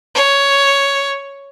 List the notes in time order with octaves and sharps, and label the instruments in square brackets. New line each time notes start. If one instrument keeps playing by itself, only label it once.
[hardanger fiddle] C#5